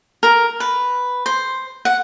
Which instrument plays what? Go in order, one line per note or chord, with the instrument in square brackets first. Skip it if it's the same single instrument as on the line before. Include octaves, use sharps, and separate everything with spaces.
[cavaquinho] A#4
B4
C5
F#5